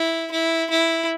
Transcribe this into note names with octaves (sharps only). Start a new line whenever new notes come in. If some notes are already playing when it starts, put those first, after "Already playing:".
Already playing: E4
E4
E4